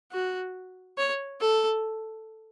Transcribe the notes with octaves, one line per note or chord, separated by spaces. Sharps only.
F#4
C#5
A4